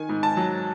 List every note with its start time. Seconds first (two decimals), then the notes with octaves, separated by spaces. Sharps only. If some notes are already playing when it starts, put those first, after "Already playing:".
Already playing: D#3 G#5
0.09 G#2
0.23 A5
0.37 F#3